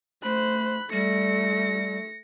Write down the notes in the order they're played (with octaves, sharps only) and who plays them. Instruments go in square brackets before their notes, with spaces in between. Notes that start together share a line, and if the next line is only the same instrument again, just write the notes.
[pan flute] A3 [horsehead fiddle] C5 [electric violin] B5 F#6
[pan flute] G3 [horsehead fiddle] A3 [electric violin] A#6 C#7